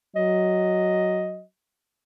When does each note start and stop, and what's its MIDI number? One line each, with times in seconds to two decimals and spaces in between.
0.16 1.43 54
0.16 1.42 75